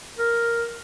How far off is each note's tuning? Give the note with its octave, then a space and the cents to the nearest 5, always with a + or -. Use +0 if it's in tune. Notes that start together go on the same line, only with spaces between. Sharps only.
A#4 +0